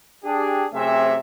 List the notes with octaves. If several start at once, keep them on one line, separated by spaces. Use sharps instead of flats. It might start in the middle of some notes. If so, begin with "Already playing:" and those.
D4 G4 G#4
F#2 C3 A3 C4 G#4 E5